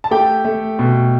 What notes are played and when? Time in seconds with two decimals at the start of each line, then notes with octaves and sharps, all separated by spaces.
0.04 A5
0.11 A3 G4 G5
0.44 A3
0.79 B2